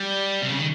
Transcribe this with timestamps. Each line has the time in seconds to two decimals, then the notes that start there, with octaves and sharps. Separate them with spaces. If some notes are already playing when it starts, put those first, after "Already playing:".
Already playing: G3
0.42 C3
0.49 C#3
0.58 D#3